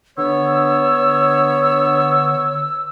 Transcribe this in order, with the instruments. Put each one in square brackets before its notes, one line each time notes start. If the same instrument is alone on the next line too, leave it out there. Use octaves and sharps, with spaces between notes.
[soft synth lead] D3 [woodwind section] B3 C#5 [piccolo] E6